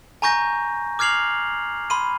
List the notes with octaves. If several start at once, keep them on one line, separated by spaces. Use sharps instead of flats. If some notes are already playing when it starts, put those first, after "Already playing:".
G#5 A#5 C#6 G6 A#6
D6 F6 G#6 C7 F7 F#7
B5 C6 D#7